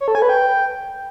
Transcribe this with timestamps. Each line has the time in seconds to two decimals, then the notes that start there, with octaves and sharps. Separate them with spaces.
0.01 C#5
0.08 A4
0.15 G#5
0.22 B4
0.29 G5